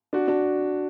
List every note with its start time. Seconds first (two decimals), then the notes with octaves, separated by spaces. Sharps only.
0.13 D4 F#4
0.28 D4 F#4